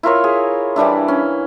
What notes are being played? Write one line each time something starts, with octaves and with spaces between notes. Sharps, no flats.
E4 F4 A#4 C#5
G#4
E3 G3 D4 E4
C#4